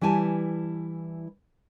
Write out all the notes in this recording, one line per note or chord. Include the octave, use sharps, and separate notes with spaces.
E3 G3 E4 G#5 A5